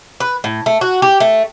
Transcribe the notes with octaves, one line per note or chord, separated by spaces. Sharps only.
B4
A2
A3
F#4
G4
A3